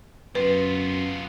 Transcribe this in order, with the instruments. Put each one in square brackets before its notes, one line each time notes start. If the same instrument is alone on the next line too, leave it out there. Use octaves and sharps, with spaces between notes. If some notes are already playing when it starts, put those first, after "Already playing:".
[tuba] F#2 [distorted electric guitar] B3 F4 [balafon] B4